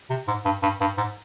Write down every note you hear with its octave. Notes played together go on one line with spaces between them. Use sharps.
C3
G#2
G2
G2
G2
G#2